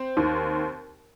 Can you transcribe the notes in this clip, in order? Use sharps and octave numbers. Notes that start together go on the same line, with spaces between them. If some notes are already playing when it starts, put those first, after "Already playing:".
Already playing: C4
D#2 D#3